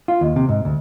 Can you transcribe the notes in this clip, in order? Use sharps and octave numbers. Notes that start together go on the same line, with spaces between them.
F4
D#2
C3
G#2
D2